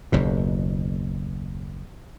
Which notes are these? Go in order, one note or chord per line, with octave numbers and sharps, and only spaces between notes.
F#1 D#2 B2